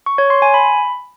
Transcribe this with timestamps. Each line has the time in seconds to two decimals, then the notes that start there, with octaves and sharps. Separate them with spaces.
0.06 C#6
0.18 C#5
0.30 C6
0.42 G#5
0.54 B5